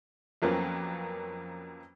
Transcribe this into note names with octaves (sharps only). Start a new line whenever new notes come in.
F2 F3 F#3 A#3 B3 C#4